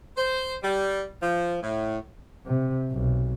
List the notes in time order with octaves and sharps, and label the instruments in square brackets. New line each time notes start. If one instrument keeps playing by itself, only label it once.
[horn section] C5
G3
F3
A2
[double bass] C3
B1